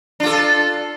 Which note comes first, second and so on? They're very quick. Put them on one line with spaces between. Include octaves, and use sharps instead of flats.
D4 F4 A4